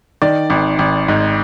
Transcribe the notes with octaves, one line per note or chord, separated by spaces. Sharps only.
D#3 D5
G#1
G#1
G#2